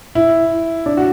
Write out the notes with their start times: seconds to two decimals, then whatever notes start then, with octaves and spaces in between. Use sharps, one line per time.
0.15 E4
0.86 D4
0.97 F#4